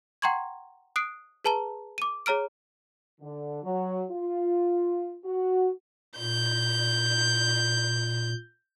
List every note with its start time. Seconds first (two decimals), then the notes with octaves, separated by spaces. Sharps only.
0.22 F#5 G5 A#5 C6 C#6 G#6
0.96 D#6 F#6 C7 D7
1.44 G#4 B4 A5 A#5 G7
1.98 D6 D#7
2.26 G#4 C#5 A#5 F6 D7
3.21 D3
3.63 F#3
4.11 F4
5.24 F#4
6.18 A#2 G6